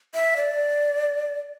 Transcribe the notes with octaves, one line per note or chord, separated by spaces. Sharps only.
E5
D5